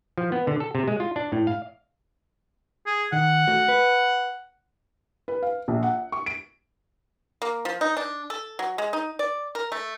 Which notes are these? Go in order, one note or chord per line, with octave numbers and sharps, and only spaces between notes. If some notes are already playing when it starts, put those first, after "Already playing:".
F3
B3
D3
A4
C3
G#3
F4
D4
A2
F5
G#4
D#3 F#5
A3 F#4
B4
B4
F5
A#1
F#5
C#6
D7
A#3
F3
D#4
D4
A4
F#3
G#3
D#4
D5
A#4
A3